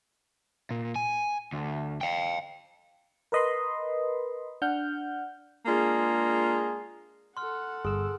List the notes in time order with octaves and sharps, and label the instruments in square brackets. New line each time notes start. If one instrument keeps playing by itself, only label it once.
[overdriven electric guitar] A#2
G#5
D2
F5 G5
[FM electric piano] A#4 B4 D#5 B5 C6
D4 F#5 F6 G6
[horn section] G#3 A#3 D4 F4 G#4
[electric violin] A4 F#5 [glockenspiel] C6 F6
[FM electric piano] G1 E6 [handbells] G#4 [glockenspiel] C6